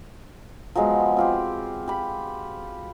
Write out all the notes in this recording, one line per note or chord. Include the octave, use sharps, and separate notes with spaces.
F3 F#3 G#3 B3
C4 F4 G4
G4 B5